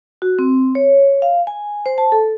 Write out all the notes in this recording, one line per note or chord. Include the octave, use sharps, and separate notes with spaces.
F#4
C4
C#5
F5
G#5
C5
A5
A4